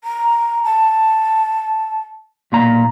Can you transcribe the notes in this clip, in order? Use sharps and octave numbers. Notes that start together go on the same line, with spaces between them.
A#5
A5
B1 A#2 A#5